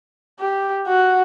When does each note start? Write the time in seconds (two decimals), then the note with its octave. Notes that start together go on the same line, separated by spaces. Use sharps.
0.40 G4
0.87 F#4